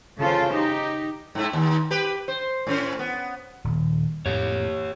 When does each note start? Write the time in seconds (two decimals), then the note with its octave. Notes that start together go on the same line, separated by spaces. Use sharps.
0.20 C#3 F4 A4 C5
0.53 D#4 G4
1.35 G#2 A3 E4
1.53 D#2
1.91 G4 B4
2.28 C5
2.67 A2 C#4 C5
2.99 B3
3.64 D#1
4.26 F2 A2 G4 C#5